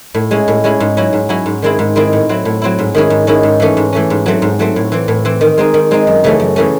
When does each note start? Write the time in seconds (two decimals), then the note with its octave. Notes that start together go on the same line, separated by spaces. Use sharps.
0.14 A2
0.31 G#3 C#4 E4
0.48 A2
0.64 G#3 C#4 E4
0.80 G#2
0.97 F#3 C#4 E4
1.13 G#2
1.29 F#3 C#4 E4
1.46 G#2
1.62 D#3 G#3 C4 E4
1.79 G#2
1.96 D#3 G#3 C4 E4
2.13 A2
2.29 F#3 C4 E4
2.45 A2
2.62 F#3 C4 E4
2.79 G#2
2.95 D#3 G#3 C#4 E4
3.10 G#2
3.27 D#3 G#3 C#4 E4
3.43 G#2
3.60 E3 A3 C#4
3.77 G#2
3.93 E3 A3 C#4
4.10 G#2
4.26 F#3 A3 C4
4.42 G#2
4.59 F#3 A3 C4
4.76 A2
4.92 E3 C4
5.08 A2
5.25 E3 C4
5.41 D#3
5.58 G#3 C4 D#4
5.74 D#3
5.91 G#3 C4 D#4
6.07 F#2
6.24 C#3 E3 A3 C#4
6.40 F#2
6.56 C#3 E3 A3 C#4